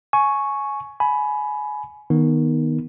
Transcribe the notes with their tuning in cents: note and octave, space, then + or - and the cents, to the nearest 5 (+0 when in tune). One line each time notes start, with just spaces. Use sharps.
G#5 +20 C#6 -5
G#5 +25 B5 +0
D#3 +0 B3 -15 D#4 +0